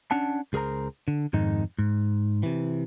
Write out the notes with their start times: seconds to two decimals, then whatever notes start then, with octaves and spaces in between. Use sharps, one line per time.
0.11 C#4 D4 F#5 A5
0.53 C#2 G#4 A#4 C5 A#5
1.08 D3
1.33 F2 G#2 D#3 D#4
1.79 G#2
2.43 C3 E3